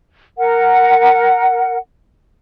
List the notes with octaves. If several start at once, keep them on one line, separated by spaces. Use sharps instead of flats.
A#4 F#5